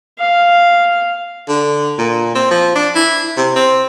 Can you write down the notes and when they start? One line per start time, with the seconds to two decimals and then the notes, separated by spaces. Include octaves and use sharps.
0.20 F5
1.49 D3
1.98 A#2
2.35 C4
2.51 F3
2.75 D4
2.95 E4
3.37 C3
3.56 C4